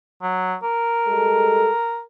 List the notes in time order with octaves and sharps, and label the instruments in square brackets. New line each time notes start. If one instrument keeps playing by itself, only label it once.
[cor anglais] F#3
A#4
[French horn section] G3 G#3 A4